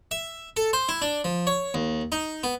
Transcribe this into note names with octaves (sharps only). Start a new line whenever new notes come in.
E5
A4
C5
E4
D4
F3
C#5
D#2
D#4
B3